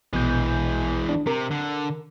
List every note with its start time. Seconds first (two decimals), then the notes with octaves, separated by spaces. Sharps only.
0.13 A#1 B2 E3 G#3 G6
1.09 D4
1.27 C3 A#4
1.51 D3